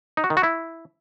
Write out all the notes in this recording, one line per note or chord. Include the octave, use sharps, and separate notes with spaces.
D#4
F#4
D#3
F#4
E4